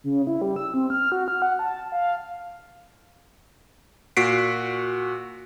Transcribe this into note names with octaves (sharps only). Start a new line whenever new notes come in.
C#3
E4
G3
E6
C4
F6
F#4
F6
F#5
A5
F5
A#2 F#4 B6 C7 D7